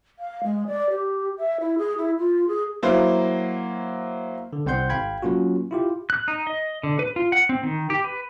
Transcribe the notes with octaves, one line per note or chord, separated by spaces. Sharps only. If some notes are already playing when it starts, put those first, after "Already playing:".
F5
G#3
D5
G4
E5
E4
G#4
E4
F4
G#4
F#3 A#3 E4 C5
D3
C2 C4 C5 F#5 C6 G6
G#1 F5 G5 B5 G#6
F#3 A#3 C#4 F4 F#4
E4 F4 G4
F#6
D#4
D#5
D3
B4
F4
F#5
C4
D#3
G4
B4